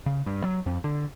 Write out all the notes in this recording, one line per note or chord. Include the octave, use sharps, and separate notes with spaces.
C#3
G2
F#3
F2
D3